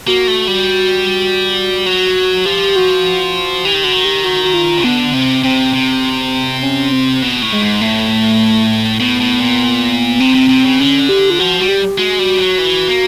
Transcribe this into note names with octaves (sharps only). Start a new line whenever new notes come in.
A#3 F#4
A3
G3
F#3
F3 G4
F#4
E3 G4
D#3
D3 F#4
D#3
G4
F#4
F#4
F4
C#3
D3 B3
C3 C4
C3 C4
C3
C#4
C4
B2
A2
G#3
G#2
A2 A3
A2 B3
A2
A#2
C3 C4
C3
C3
C#3
D3 C#4
G4
F4
F3 F#4
G3 F#4
G4
G#3 F#4
G3
F#3
E3
A#3